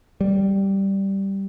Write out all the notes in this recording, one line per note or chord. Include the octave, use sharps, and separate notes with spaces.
G3